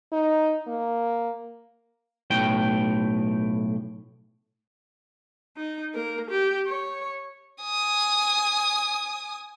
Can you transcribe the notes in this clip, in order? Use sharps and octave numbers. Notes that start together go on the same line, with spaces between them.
D#4
A#3
B1 A2 G5
D#4
A#3 A#4
G4
C#5
G#5 D#6